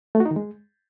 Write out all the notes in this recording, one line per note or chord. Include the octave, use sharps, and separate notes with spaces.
A3
F#4
D#4
D#3
G#3